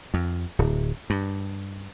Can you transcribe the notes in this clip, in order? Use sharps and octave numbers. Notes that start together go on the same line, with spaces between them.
F2
D1
G2